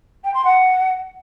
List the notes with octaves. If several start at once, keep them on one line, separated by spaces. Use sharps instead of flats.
G5
C6
F#5